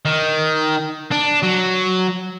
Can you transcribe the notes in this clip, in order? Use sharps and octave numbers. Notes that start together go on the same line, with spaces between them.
D#3
D4
F#3